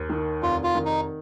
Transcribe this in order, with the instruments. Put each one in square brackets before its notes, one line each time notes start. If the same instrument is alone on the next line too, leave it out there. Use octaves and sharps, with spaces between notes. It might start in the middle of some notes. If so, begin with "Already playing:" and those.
Already playing: [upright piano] D#2
D#3
[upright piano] F1 [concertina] F4
[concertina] F4
[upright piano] D#3
[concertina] D#4